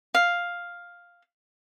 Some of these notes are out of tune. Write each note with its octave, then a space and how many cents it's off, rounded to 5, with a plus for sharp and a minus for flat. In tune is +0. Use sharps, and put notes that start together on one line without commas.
F5 +5